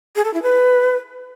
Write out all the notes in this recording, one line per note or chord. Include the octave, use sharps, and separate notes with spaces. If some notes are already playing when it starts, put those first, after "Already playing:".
G#4
A4
E4
B4